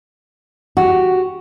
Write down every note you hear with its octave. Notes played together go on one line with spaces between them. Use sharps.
F#4 G4